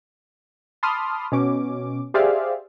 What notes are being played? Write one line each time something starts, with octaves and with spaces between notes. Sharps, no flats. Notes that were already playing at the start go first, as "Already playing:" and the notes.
A5 B5 C6 D6 D#6 F6
B2 C#4 D6
G4 G#4 C5 D5 E5 F5